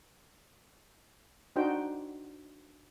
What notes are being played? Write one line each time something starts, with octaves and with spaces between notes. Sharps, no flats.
D4 D#4 F#4 C5 G5